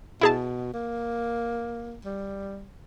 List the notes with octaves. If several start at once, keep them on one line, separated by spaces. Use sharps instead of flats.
B2 E4 G#4 A5
A#3
G3